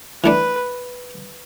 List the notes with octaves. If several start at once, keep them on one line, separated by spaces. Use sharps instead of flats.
E3 A3 D4 B4